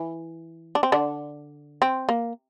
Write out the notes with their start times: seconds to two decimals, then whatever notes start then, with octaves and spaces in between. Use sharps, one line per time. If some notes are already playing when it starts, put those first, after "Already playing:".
Already playing: E3
0.75 D4
0.83 C4
0.92 D3 D4
1.82 C4
2.09 A#3